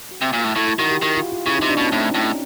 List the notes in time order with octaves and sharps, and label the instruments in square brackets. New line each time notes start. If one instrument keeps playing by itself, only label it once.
[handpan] F#4
[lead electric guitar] C3
A#2
A2
[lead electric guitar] A2 [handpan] E4
[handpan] E4
[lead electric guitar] D#3 [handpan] F#4
[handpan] G4
[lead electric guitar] D#3 [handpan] G4
[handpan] F4
F4
[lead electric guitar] C#3 [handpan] E4
[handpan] D#4
[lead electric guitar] C3
[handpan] D4
[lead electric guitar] B2 [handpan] C#4
[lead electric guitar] A2 [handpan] C4
[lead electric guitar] A2